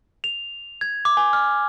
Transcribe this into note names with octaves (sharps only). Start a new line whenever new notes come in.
F7
G#6
D6
G#5
F6